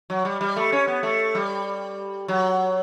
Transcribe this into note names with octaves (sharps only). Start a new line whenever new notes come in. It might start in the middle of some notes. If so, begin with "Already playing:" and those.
F#3
G3
G3
A3
C#4
B3
A3
G3
F#3